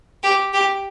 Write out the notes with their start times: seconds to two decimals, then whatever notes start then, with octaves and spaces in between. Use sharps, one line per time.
0.23 G4
0.53 G4